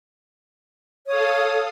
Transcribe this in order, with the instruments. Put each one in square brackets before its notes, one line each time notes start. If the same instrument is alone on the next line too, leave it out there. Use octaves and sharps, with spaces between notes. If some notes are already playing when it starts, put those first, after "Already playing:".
[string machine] A4 F5 D#6 [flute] C#5